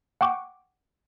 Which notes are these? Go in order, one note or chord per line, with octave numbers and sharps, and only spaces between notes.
F#5 G5 C#6 D6